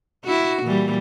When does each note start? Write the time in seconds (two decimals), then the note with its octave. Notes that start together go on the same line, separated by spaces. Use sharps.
0.25 E4 F#4
0.63 A#2 E3 G3